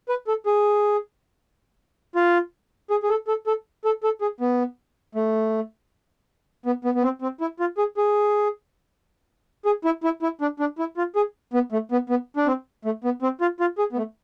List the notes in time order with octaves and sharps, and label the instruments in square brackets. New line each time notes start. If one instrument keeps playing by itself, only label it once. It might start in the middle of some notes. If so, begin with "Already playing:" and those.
[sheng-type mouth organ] B4
A4
G#4
F4
G#4
G#4
A4
A4
A4
A4
A4
G#4
B3
A3
B3
B3
B3
C4
C4
E4
F4
G#4
G#4
G#4
E4
E4
E4
D4
D4
E4
F4
G#4
B3
A3
B3
B3
D4
C4
A3
B3
C4
F4
F4
G#4
B3
A3